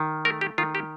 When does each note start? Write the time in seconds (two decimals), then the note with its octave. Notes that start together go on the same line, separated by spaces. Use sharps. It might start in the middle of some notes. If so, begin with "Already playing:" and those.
Already playing: D#3
0.25 A3 A#4
0.41 G4
0.58 D#3 F4
0.75 G4